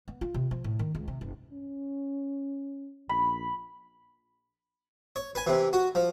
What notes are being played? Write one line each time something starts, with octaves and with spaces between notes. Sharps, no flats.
B3
F4
C3
F3
A2
D#3
C#2
C3
F#1
C#4
A#1 B5
C#5
B4 G#5
C3 E3
F#4
F3